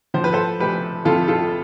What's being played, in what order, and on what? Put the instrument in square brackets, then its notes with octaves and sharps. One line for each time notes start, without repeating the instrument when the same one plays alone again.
[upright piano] F3 C5
B4
A4 C5
F1 G4 B4
F2 F4 A4
F4 A4